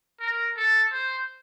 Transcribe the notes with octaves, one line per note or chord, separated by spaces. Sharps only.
A#4
A4
C5